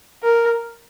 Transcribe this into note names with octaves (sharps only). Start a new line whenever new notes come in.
A#4